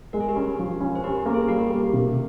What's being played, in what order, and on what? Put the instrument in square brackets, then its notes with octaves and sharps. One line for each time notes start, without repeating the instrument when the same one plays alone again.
[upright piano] G#3 [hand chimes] A#4
[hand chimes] G#4
G4 A#4
[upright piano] C#4
F3
C#4
[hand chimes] C5
[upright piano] C#4 [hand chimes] G4 A#4
[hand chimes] G4
[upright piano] A#3
[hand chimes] G#4
[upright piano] G3 [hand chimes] G4 A#4
[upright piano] A#3
C3